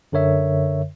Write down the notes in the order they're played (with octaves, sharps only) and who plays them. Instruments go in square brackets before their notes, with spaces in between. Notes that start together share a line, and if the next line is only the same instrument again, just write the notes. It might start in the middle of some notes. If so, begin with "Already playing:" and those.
[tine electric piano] F#2 D3 A#4 C#5 E5